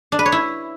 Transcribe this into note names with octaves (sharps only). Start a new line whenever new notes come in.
D4
B4
C#5
E4